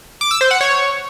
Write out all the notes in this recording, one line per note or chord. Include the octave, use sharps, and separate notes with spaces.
D6
E6
C5
F#5
C#5